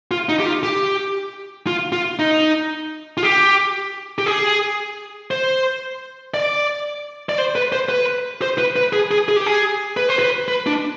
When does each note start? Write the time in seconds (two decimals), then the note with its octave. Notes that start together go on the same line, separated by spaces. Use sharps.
0.11 F4
0.29 D#4
0.40 G4
0.46 F4
0.63 G4
1.67 F4
1.92 F4
2.19 D#4
3.17 F4
3.23 G4
4.18 G4
4.26 G#4
5.31 C5
6.34 D5
7.29 D5
7.38 C5
7.56 B4
7.72 C5
7.89 B4
8.42 C5
8.58 B4
8.76 B4
8.93 G#4
9.11 G#4
9.28 G#4
9.36 G4
9.47 G#4
9.97 B4
10.09 C5
10.19 B4
10.48 B4
10.67 D4